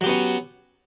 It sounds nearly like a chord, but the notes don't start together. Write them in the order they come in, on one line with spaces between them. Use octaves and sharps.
F#3 G4 B3 C#4